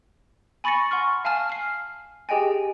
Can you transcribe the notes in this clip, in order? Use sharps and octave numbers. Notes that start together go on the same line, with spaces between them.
G#5 B5 C#6 A6 A#6 C#7
F#5 C6 C#6 F6
F5 G#5 A5 F6
F6 C7
G4 G#4 D#5 G5 G#5